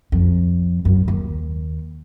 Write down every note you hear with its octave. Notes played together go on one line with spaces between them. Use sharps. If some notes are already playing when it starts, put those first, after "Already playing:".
F2
F#2
D#2